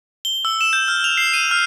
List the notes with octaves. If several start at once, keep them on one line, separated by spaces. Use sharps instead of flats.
G7
E6
E7
G6
F6
F7
C7
D#7
F6